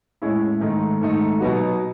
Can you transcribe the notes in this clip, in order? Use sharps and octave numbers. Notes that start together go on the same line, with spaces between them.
A2 G#3 C#4 E4
G#2 D#3 A3 D#4
G#2 D#3 A3 D#4
B2 F#3 B3 D#4 F#4